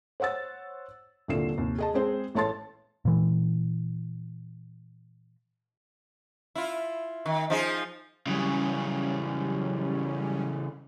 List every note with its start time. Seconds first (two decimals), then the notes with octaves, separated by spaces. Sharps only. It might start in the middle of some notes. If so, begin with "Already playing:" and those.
0.20 C5 C#5 F#5 E6 A6
1.28 D#1 C2 D3 F4 C7 E7
1.57 D#2 C3
1.78 G#4 D#5 A5
1.94 G#3 C4 G#4 C5
2.35 A1 A4 C#5 A5 C6 A6
3.05 A#2 E3
6.55 E4 F4
7.26 D#3
7.50 F3 D#4 G#4
8.27 C#3 E3 F#3 G3 C#4